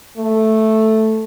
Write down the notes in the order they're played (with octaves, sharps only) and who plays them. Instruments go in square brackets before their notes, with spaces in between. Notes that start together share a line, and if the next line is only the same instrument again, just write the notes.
[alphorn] A3